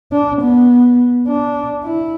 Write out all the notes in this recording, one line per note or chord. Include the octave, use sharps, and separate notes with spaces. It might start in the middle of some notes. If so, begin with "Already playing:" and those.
D4
B3
D4
E4